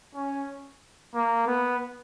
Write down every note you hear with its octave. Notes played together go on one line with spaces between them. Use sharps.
C#4
A#3
B3